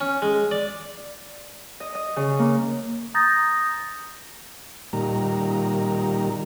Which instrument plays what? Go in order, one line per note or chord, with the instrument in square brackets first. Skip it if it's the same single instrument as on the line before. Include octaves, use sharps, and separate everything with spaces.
[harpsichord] C#4
G#3
D5
[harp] D#5
D#5
C#3
A#3
[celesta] A#5 D#6 G6 A6 A#6
[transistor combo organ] A#2 D#3 G3 A#5